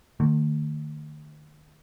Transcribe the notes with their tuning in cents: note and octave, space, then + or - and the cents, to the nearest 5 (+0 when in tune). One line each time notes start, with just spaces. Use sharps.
D#3 -45 A3 +35